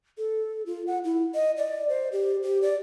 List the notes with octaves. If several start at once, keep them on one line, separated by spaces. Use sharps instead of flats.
A4
F4
F#5
E4
D#5
D5
C5
G4
G4
D5